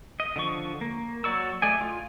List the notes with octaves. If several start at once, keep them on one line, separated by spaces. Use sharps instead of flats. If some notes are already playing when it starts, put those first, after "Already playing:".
D#5
D3 F3 C#6
A#3
F#3 D5 C#6 E6
A3 D5 D#5 G#5
F4